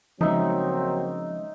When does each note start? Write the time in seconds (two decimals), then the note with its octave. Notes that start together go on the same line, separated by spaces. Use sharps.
0.21 C#3 F3 F#3 G#3 A#3 C4 D#4 E5